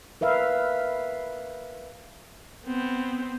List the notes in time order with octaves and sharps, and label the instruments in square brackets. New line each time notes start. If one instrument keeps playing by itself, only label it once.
[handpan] A#4 B4 E5 F5
[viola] B3 C4